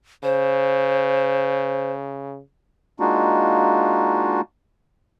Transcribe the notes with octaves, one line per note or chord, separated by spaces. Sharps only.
C#3 C5
G#3 A#3 D4 D#4 F4 F#4